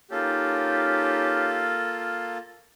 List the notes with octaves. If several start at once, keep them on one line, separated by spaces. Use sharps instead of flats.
A#3 C#4 D#4 F4 G4 A4